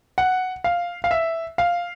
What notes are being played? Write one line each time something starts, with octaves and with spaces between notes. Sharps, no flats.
F#5
F5
F5
E5
F5